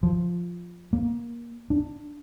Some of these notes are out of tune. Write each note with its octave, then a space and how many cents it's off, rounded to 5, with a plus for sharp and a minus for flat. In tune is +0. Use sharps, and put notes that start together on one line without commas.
F3 +0
A#3 +20
D4 +10